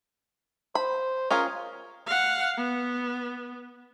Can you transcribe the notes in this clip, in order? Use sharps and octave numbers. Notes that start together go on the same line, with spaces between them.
C5 B5
C#4 F4 G#4 A#4
F5 F#5
B3